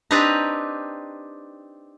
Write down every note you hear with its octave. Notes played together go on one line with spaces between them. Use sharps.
C4 D4 D#4 G4 B4 A#5